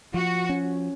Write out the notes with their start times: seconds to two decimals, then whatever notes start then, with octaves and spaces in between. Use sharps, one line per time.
0.14 F3 F#4
0.49 C#4